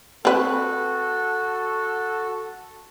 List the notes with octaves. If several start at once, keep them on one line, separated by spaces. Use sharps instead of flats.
C4 F#4 A4 B4